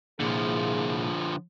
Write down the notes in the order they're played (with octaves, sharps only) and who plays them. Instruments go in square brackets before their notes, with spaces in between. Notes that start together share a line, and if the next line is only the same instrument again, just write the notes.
[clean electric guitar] C2 A#2 [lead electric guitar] D3 F3 [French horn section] E4 F4 G#4